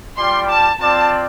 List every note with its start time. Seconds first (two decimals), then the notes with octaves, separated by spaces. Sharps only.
0.18 G3 F4 D5 G5 C6
0.49 A5
0.81 C4 F4 D5 A5